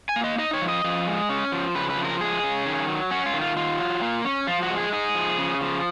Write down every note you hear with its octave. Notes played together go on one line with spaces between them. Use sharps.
G#5
A#3
D#5
D#4 D#5
C#5
F3
D#5
F3
G#3
C#4
F3
C#3 B4
B4
F3
A#4
G#3 G#4
C#4
D#3
F#3
C#4 F#4
F4
D#3
F4
D#3 F4
F#3
A#3
C#4
F3 F4
F#4
G#3
G#4
D#4 G#4
F3
C#3
F3